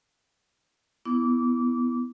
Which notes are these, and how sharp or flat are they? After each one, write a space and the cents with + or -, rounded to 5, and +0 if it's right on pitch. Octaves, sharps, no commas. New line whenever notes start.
B3 +0 E4 +0 D6 -25